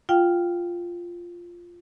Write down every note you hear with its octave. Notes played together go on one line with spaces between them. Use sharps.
F4 F5 G5